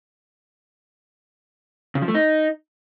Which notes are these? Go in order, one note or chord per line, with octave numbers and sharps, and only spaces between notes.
C#3
F3
A3
D#4